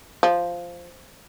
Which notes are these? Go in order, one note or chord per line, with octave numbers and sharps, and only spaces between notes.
F3